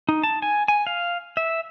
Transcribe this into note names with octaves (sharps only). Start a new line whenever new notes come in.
D#4
A5
G#5
G#5
F5
E5